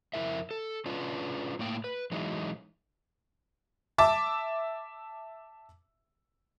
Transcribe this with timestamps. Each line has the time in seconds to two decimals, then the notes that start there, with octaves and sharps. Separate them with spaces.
0.14 F2 D#3 E4 A#4 E5
0.51 A4
0.86 C#4 D4 F4 B4
1.59 A2 A#3 G5
1.84 B4
2.11 E3 F#3 G#3 D#4
3.98 E5 A5 D6